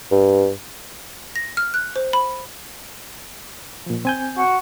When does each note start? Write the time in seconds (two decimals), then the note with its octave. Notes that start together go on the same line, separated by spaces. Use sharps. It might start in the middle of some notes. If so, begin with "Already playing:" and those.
0.11 G2
1.36 A#6
1.57 F6
1.74 F#6
1.96 C5
2.13 B5
3.86 A#2 F3
4.05 C4 G#5 G6
4.38 F#4